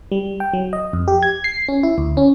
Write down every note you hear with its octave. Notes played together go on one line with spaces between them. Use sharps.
G3
G5
F#3
D#5
F2
G4
G#6
C7
C#4
E4
D2
C#4